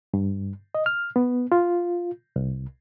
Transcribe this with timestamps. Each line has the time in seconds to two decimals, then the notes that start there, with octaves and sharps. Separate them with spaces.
0.14 G2
0.75 D#5
0.86 F6
1.16 B3
1.52 F4
2.36 C2